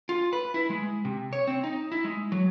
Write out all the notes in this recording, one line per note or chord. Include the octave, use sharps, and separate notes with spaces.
F4
B4
E4
G#3
C3
C#5
C4
D#4
E4
G#3
F#3